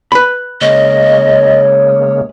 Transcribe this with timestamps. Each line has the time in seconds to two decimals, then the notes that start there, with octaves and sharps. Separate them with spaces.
0.12 B4 B5
0.61 C#3 G#3 A#3 C#5 D#5